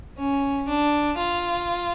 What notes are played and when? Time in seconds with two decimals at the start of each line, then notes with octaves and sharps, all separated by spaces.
0.18 C#4
0.68 D4
1.18 F4